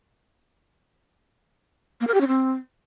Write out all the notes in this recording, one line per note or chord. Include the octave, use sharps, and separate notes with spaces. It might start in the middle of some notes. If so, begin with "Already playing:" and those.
A#3
A#4
G4
C#4
C4